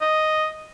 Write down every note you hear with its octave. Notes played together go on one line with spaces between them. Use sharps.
D#5